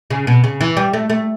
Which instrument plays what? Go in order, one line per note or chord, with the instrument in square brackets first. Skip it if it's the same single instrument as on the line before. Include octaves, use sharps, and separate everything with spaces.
[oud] C#3
B2
C#3
E3
G3
A3
A3